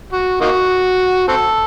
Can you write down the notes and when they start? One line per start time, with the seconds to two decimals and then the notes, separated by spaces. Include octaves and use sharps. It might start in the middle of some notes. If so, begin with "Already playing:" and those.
0.13 F#4
0.41 A#3 D#4 F#4
1.28 C4 F#4 A4